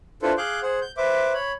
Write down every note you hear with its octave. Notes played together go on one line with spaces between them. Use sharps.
D4 E4 F4 A4 B4 C5
G#4 F5 D6 F#6 G6
G#4 C5 F#5
G6
B4 C5 E5 D6
C#5 B5